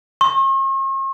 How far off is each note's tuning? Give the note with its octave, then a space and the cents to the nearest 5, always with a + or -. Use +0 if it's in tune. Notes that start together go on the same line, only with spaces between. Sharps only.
C#6 -45